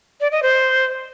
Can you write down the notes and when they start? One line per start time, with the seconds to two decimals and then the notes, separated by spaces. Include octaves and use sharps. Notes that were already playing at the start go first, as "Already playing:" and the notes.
0.21 D5
0.32 D#5
0.43 C5